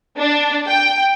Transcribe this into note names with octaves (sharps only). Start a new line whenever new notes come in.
D4
G5